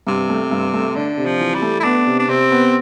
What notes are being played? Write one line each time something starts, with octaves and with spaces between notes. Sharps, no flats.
G2 C3
A3
G2
A3
D3 D4
C3
F3
E3
G3
A3
E4
B3 D4
C3
D4
C3 C4
B3